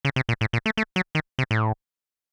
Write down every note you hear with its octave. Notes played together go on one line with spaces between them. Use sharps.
C#3
C3
A#2
A2
A#2
A3
A3
F#3
D#3
C3
A2